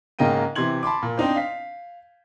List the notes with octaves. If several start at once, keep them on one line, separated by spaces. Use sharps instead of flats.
G#2 C#3 A#3 D#5 G5 D#7
C3 E3 C6 G#6 F#7
A5 B5 C6 D6
A#2
C4 D4 D#4 C5
F5 B6